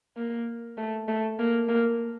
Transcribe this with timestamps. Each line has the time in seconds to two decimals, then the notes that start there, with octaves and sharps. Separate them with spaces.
0.16 A#3
0.78 A3
1.08 A3
1.39 A#3
1.69 A#3